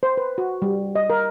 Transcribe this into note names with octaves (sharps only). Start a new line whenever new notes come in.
C5
B4
F#4
G3
D#5
A#4